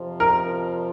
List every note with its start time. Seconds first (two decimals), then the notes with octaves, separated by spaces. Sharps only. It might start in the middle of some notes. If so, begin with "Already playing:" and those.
Already playing: F2 C3 F3
0.20 A#4